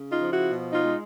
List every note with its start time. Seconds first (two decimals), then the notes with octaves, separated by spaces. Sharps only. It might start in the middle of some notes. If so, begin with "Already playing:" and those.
Already playing: C#3
0.10 D#4 F4
0.20 F3
0.31 E4 F#4
0.51 B2
0.72 D#4 F4
0.83 G#3